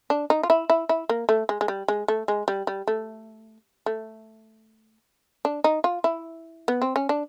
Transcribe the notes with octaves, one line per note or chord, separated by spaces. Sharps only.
D4
D#4
F4
E4
E4
E4
A#3
A3
G#3
G#3
G3
G#3
A3
G#3
G3
G3
A3
A3
D4
D#4
F4
E4
B3
C4
C#4
D4